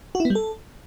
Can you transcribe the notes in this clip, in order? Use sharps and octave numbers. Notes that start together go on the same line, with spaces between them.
F#4
E4
B3
G3
A4